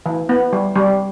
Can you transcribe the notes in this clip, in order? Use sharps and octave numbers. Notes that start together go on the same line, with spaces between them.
E3
B3
G3
G3